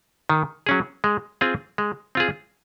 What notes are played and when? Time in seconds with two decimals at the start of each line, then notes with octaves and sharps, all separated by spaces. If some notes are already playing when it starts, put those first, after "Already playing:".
0.29 D#3
0.66 F#3 C#4 G#4
1.04 G#3
1.41 C4 F4 G#4
1.78 G#3
2.15 C4 F4 G#4